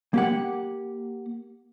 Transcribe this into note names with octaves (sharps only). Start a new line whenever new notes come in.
A#3 G4 F#5